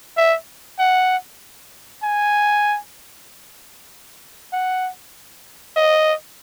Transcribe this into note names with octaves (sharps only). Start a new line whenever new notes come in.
E5
F#5
G#5
F#5
D#5